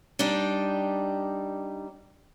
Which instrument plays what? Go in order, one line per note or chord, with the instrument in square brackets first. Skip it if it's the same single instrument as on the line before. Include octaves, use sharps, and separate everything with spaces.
[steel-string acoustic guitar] G3 D4 D#4 G4